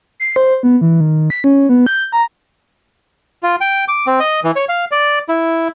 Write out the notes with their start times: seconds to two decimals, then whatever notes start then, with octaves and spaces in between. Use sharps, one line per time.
0.20 C7
0.36 C5
0.63 B3
0.81 E3
1.01 D#3
1.30 B6
1.44 C#4
1.69 B3
1.87 G6
2.12 A#5
3.43 F4
3.61 G5
3.88 D6
4.07 C4
4.20 D#5
4.44 E3
4.56 C#5
4.69 F5
4.92 D5
5.29 E4